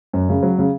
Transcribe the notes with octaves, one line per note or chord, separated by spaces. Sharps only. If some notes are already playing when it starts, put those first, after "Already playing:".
F#2
C#3
F#3
C#3